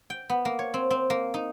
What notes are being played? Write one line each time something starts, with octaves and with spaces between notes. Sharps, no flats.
G5
B3
A#3
C#5
C4
C4
A#3
D#4